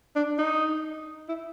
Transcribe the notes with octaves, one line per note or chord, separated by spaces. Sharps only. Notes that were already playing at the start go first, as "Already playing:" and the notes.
D4
D#4
E4